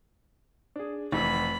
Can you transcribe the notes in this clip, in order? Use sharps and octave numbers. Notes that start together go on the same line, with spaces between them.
D4 G#4
F1 E3 B5